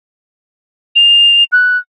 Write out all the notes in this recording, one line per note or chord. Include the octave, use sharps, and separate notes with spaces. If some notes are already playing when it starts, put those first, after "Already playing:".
F7
F#6